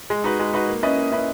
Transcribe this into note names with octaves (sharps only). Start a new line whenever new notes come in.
G#3
D#4 F#4 B4
G#3
D#4 F#4 B4
A#3
C#4 E4 B4 D#5
A#3
C#4 E4 B4 D#5